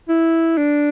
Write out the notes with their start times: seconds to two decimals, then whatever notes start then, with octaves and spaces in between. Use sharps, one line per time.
0.09 E4
0.57 D4